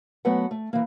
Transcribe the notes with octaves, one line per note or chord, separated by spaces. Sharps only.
F#3 A3 B3 B4 F#5
A3
E3 A#3